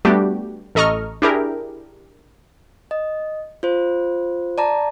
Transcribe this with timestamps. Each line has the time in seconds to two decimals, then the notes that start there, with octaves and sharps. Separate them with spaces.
0.05 G3 A3 B3 D4 F#4 G4
0.75 A1 A4 D#5 A#5 C#6 F6
1.22 D4 E4 G4 G#4 A#4
2.91 D#5
3.63 F4 C5
4.58 D5 A5 A#5